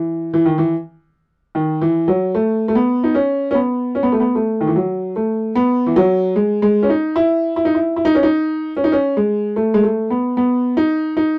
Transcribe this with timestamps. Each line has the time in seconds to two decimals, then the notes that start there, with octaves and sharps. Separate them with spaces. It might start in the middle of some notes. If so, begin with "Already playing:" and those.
Already playing: E3
0.34 E3
0.46 D#3
0.58 E3
1.55 D#3
1.81 E3
2.08 F#3
2.35 A3
2.68 A3
2.75 B3
3.04 D#4
3.15 C#4
3.51 C#4
3.54 B3
3.95 C#4
4.03 B3
4.12 A3
4.20 B3
4.35 A3
4.61 D#3
4.67 E3
4.76 F#3
5.16 A3
5.55 B3
5.86 E3
5.96 F#3
6.36 G#3
6.62 G#3
6.83 C#4
6.89 D#4
7.16 E4
7.56 E4
7.65 D#4
7.75 E4
7.96 E4
8.05 D#4
8.15 C#4
8.23 D#4
8.77 C#4
8.84 D#4
8.92 C#4
9.17 G#3
9.56 A3
9.74 G#3
9.83 A3
10.10 B3
10.37 B3
10.77 D#4
11.17 D#4